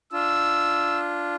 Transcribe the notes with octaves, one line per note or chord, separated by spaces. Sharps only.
D4 F4 E6